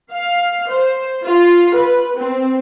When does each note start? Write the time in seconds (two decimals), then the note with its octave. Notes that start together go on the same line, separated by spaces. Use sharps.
0.11 F5
0.69 C5
1.22 F4
1.75 B4
2.16 C4